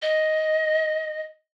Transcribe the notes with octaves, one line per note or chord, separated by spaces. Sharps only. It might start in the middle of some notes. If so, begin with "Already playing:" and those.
D#5